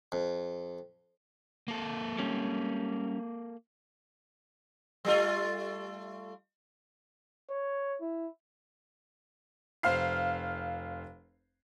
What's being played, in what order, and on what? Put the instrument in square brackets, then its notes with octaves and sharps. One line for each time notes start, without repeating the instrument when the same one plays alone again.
[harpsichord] F2
[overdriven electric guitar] A#3 A4
[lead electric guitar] G3 C#4
[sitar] G3 A3 F4
[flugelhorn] C#5
E4
[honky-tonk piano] F1 C5 F5 F6 C7